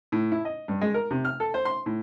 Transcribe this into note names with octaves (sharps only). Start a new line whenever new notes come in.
A2
E4
D#5
G2
G#3
A#4
C3
F6
A4
C5
C6
A2